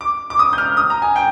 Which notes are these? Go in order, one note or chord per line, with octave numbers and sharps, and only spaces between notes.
D6
D6
D#6
G6
F6
D#6
A#5
G#5
G5